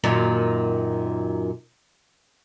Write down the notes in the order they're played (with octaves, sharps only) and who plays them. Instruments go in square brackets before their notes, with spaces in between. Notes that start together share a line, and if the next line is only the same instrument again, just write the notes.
[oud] F#2 A#2 D#3